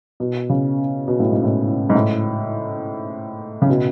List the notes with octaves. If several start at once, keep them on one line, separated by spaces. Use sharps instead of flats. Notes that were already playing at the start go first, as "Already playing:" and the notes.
B2
C#3
B2
A2
G#2
A2
G#2
A2
C#3
B2